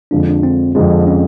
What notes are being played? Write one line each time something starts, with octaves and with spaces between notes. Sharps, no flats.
F2 D3 F3 G#3 D4
D4
C4
F2 D3 F3 G#3 C4
C#4